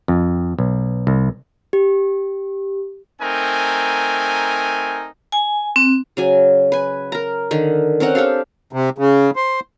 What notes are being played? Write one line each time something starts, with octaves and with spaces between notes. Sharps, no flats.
F2
B1
C2
G4
A3 C4 D#4 A#4 G#5
G#5
C4
C#3 F#3 G#5
B4 G#5
A#4 A#5
D3 D#3
C4 C#4 A#4 F#5
D4 G4 A4 F5
C3
C#3
C5